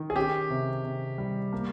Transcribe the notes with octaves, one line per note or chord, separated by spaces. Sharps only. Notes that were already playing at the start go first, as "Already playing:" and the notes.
Already playing: D#3
G#4
C#4 G4
C3
C3
G3
A#3